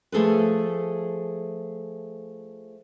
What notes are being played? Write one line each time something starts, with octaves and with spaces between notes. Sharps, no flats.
F3 A3 G#4 A4 B4